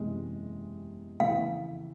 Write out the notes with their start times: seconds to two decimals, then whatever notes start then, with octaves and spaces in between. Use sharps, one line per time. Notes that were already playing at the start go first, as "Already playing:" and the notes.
Already playing: F#1 E2 C3 E3 G#3
1.20 F2 C#3 E3 A3 F5